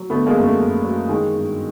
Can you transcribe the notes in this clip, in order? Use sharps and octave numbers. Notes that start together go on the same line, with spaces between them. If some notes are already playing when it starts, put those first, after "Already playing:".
Already playing: F#3
D3 A3 B3
G#3 A#3
F#2
A3
F#2
F#3
D#3 G#3
G2